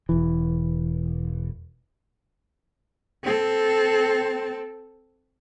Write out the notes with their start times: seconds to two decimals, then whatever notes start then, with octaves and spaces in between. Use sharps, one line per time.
0.09 E1 E3
3.23 C4 A4